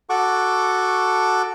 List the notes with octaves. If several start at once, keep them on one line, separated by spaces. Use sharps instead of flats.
F#4 A4 F#5 C#6 D6